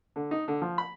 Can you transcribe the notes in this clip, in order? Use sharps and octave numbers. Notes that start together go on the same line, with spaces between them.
D3
D#4
D3
F3
B5